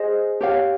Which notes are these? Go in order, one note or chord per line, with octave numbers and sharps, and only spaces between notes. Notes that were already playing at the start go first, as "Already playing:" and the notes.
Already playing: G#4 C5 D#5
G4 C#5 F5